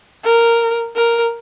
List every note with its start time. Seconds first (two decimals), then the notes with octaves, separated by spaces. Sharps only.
0.24 A#4
0.96 A#4